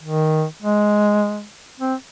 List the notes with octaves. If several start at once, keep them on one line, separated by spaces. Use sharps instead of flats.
D#3
G#3
C4